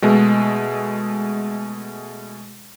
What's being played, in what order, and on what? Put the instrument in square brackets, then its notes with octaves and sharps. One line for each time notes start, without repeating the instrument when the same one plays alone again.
[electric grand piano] B2 G#3 A3